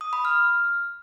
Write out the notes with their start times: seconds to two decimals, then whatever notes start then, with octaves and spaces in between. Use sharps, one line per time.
0.01 D#6
0.13 B5
0.25 F6